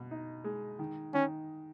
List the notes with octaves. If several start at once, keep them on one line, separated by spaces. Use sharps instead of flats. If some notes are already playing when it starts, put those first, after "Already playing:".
Already playing: B2
D#4
G#3
D#3
D#3 C#4